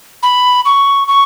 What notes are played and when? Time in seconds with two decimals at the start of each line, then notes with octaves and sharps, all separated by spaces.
0.23 B5
0.65 C#6
1.08 C#6